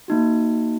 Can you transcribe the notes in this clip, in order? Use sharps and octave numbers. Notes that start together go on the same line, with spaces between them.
A#3 D#4 F#4